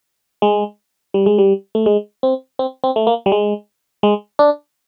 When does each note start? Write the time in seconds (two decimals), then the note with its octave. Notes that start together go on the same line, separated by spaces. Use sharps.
0.42 G#3
1.14 G3
1.26 G#3
1.38 G3
1.75 A3
1.86 G#3
2.23 C4
2.59 C4
2.84 C4
2.96 A3
3.07 A#3
3.26 G3
3.32 G#3
4.03 G#3
4.39 D4